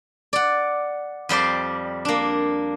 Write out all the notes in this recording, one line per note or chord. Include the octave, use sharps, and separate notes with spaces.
D5 F#5
F2 G3 C5 D5
A#3 D4